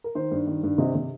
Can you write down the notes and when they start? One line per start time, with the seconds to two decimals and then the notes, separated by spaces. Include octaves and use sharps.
0.04 A#4
0.15 D#3 C5
0.32 G2
0.47 D#3
0.64 G2
0.78 C3 D#5
0.95 C3